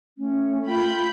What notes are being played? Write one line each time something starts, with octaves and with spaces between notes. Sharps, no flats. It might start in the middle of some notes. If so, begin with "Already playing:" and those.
A3 C#4
F4 G5 B5 G6